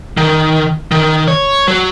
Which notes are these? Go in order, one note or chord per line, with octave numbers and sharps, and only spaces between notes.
D#3
D#3
C#5
F#3